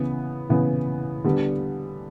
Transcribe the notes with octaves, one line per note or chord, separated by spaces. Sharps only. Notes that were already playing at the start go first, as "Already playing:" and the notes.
Already playing: C#3 E3 B3
C#3 E3 B3
D3 G3 B3